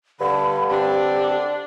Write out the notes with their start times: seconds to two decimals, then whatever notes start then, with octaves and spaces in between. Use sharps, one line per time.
0.20 G2 D3 B5
0.70 D3 C4 D4 G4